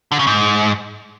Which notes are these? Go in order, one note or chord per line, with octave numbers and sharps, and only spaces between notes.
D3
C#3
G#2